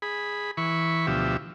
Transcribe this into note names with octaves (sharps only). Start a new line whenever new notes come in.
G#4 B5
E3 B5 C#6
D2 B2 F3 G4 E5